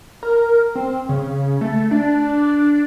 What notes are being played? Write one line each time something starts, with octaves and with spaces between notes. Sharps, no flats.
A#4
C4
C#3
A3
D4